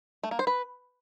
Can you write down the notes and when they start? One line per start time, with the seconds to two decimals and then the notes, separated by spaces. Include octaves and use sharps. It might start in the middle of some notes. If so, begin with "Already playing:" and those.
0.23 A3
0.31 A#3
0.39 C5
0.47 B4